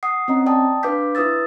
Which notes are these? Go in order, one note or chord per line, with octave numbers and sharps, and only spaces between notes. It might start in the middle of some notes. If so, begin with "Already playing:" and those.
F#5 D#6 C7
C4 C#4 D#5 A#5
D5 G5 A5 D#6
D4 B4 F5 D6 G6 B6
E4 B4 D#6 E6 A6